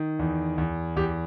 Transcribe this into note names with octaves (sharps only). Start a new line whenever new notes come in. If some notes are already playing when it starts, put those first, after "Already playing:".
Already playing: D#3
E2
E2
E2 G4